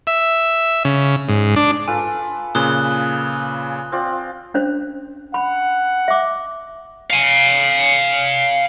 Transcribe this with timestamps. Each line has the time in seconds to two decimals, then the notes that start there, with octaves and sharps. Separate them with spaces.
0.07 E5
0.85 C#3
1.29 G#2
1.56 D4
1.88 F4 A4 B4 G#5
2.55 A#2 C#3 B4 D#6 F#6 G7
3.92 C4 F4 D5
4.54 C#4 D4 C5
5.34 F#5 B5
6.08 E5 D6
7.11 F5 G#5